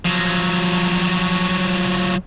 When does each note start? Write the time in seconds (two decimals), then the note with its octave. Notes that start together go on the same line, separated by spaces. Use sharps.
0.05 F3 F#3